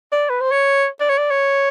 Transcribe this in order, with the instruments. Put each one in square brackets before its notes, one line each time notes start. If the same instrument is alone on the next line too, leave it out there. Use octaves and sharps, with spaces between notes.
[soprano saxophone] D5
B4
C5
C#5
D5
C#5
D5
C#5